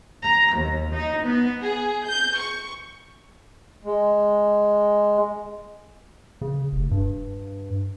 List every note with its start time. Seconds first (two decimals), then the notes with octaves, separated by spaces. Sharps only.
0.24 A#5
0.55 D#2
0.92 D#4
1.24 B3
1.62 G#4
2.05 G6
2.39 C#6
3.85 G#3
6.41 C#3
6.73 F1
6.91 G2